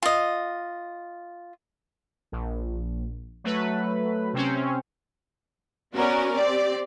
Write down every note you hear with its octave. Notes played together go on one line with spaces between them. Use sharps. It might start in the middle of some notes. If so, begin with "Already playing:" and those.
F4 D#5
A#1
F#3 A3 B4
C3 C4 C#4
B3 C#4 F#4 A#4 D5
C4 G4 D5